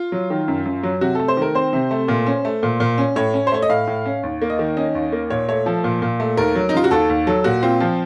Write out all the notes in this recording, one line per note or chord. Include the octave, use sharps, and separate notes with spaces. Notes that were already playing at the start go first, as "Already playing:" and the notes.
Already playing: F4
F#3
D#3
F#2
F#2
F#3
C3 F#4
A3 A4
C5
D#3 A#4
C4 C5
C3
A3
A#2
C#4
A3
A#2
A#2
C#4
A2 C#5
C#4
C5
A3 C#5
D#5
A2 F5
A2
C#4
D#2
A#3
D#5
D#3
C#4 D#5
D#2
A#3
A#2 C#5
A3 C#5
F3 A4
A#2
A#2
A3
D#2 A#4
F#3
D#4
C#3 F4
F#4
D#2 A4
D#2
F#3 A4
A#2 F#4
C4 F4
F3 F4